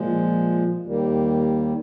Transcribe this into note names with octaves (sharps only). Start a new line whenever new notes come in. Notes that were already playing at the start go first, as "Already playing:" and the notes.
Already playing: A#2 F3 G#3
D#2 D#3 G3 A#3